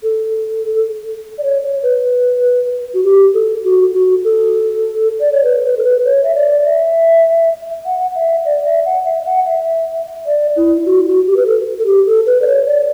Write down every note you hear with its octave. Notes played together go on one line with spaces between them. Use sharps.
A4
D5
C#5
C#5
B4
F#4
G4
A4
F#4
F#4
A4
D5
C#5
B4
B4
A4
B4
C#5
E5
D5
E5
F#5
E5
D5
E5
F#5
E5
F#5
E5
D5
E4
F#4
F#4
G4
B4
A4
A4
G4
A4
B4
D5
C#5
D5